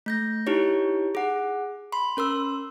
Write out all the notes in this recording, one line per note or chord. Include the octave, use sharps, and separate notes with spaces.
A3 G6 A#6
D#4 E4 G4 C#5
G#4 F#5
B5 C6
C#4 A#4 C6 E6